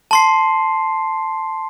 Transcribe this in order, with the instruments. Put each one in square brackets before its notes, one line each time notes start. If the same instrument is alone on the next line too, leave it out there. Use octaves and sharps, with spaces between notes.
[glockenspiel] A5 C6 C7